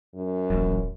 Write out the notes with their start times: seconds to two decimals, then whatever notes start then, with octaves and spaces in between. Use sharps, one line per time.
0.15 F#2
0.50 D#1 A1 A#2 F#3